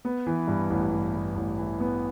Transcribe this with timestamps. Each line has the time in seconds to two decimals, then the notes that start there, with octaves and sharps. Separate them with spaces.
0.05 B3
0.26 E3
0.47 G2
0.70 A1
0.91 G2
1.14 G2
1.36 A1
1.58 E3
1.80 B3